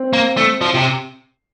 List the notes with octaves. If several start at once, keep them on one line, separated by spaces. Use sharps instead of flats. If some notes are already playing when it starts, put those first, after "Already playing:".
Already playing: C4
A#3
A3
F3
C3